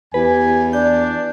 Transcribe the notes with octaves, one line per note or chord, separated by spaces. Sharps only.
E2 G4 B4 G#5
D4 D5 G6